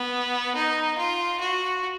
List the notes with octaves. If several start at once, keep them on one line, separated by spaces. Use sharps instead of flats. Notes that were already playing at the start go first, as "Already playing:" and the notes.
Already playing: B3
D#4
F4
F#4